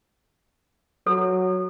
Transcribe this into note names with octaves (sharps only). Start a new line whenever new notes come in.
F#3 A4